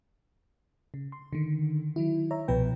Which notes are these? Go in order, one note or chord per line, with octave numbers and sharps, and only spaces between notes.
C#3
C6
D3 D#3
D#3 F#3 E4
C#5 E5 A#5
C2 B2 F3 B3 B4 G5